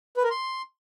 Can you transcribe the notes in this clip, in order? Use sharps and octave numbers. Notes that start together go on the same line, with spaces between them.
B4
A#4
C6